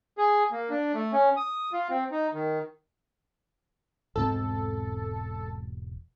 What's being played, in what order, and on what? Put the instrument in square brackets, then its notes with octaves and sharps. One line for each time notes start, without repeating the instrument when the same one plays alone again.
[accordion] G#4
A#3
D4
A3
C#4
D#6
F4
C4
D#4
D#3
[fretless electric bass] E1 G#2 C4 [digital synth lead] A4